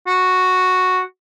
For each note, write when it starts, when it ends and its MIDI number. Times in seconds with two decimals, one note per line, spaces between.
0.07 1.00 66